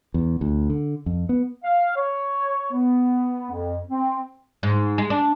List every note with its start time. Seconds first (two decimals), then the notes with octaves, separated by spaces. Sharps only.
0.14 E2
0.41 D2
0.70 D3
1.06 F2
1.29 B3
1.64 F5
1.97 C#5
2.72 B3
3.51 F2
3.90 C4
4.63 G#2
4.98 G#3
5.10 D4